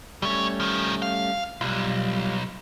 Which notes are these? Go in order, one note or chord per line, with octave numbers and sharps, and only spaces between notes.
B2 G3 A3 C#4 C#5
D#3 F3
F5
B1 G3 F4